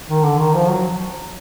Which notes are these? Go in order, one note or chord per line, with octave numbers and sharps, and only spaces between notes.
D#3
D3
D#3
F3
F#3